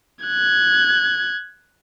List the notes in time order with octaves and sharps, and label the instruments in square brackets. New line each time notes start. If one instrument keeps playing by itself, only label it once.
[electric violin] F#6 G#6